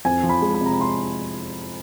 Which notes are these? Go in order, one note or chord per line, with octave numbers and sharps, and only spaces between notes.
F2 G#5
F3
B5
G#3
B5
C3
A#5
B5
C6